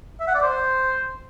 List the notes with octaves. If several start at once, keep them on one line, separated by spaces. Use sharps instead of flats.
E5
F#5
D5
C5